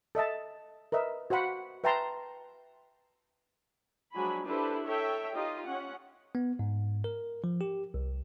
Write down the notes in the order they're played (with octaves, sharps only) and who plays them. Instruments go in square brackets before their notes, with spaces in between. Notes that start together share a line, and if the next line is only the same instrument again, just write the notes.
[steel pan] A4 D#5 E5 A5
A#4 B4 D#5 E5
F#4 C5 F5 F#5 B5
B4 E5 G5 A5 A#5 C6
[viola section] F3 F#3 G#3 D4 G#5 B5
D4 E4 G4 A4 B4 C5
A4 C#5 E5 G5
D#4 F4 G4 D#5
C#4 F#5
[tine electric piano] B3
G#2
A#4
F3
G4
C2